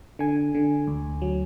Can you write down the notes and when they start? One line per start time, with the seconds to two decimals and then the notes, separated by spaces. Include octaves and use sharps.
0.19 D3 G#5
0.55 D3
0.87 D2
1.22 F#3